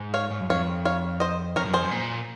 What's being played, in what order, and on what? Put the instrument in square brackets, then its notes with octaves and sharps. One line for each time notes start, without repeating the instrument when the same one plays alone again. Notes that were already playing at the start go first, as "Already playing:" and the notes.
Already playing: [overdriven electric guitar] G#2
[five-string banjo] C#5 F5
[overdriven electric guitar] G#2
F#2
[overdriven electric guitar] F2 [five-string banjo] C#5 F5
[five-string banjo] C#5 F5
C5 D#5
[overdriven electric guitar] F2 [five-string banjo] A#4 C#5
[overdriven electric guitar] F#2
[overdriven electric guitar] F2 [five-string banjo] G#4 C5
[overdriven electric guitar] F#2
A#2